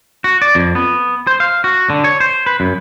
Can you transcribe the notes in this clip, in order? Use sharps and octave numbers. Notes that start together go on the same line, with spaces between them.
F#4
D5
F2
B3
C5
F5
F#4
D3
C#5
C5
B4
F#2